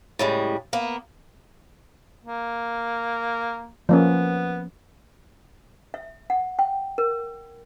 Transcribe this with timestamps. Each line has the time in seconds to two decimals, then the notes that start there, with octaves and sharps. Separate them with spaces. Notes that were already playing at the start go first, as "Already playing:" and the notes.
0.19 A2 C#3 G3 G#3
0.73 A#3 B3
2.25 A#3
3.89 F3 A#3 B3 C#4
5.94 E5
6.30 F#5
6.59 G5
6.98 A#4